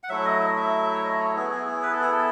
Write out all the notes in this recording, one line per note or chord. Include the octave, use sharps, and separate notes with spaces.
F#5
F#3 A3 E4 E5
D#5
D#5
E5
C#5
D#5
C#5
B3 E4 G#4
G#4
G#4
B4
A4
G#4
A4